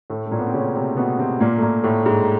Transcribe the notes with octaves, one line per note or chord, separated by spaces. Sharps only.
A2 A3
A3
A#2 A#3
B3
C4
C#3 C#4
C3 C4
B2 B3
C3 C4
A#2 A#3
A3
A#2 A#3
A2 A3
G#2 G#3